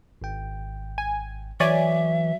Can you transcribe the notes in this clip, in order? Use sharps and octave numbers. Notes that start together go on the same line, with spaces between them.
G#1 G5
G#5
E3 F#3 C#5 D5 E5 G#5